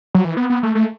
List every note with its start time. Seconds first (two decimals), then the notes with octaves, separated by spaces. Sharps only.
0.15 F#3
0.25 E3
0.37 B3
0.50 B3
0.63 A3
0.75 A3